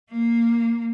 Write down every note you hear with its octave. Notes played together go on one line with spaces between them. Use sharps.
A#3